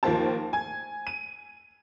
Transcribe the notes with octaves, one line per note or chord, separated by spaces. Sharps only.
D#2 F3 A#3 C5 G5 A5
G#5
D#7